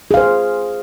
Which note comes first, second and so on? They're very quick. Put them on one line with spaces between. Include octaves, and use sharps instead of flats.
G#4 F5 C5